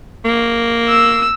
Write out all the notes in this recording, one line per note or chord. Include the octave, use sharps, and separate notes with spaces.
A#3
E6